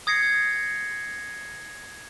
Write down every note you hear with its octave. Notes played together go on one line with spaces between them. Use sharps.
D#6 G#6 A#6 C7 C#7